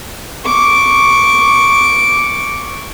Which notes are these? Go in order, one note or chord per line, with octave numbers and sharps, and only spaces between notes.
C#6 D6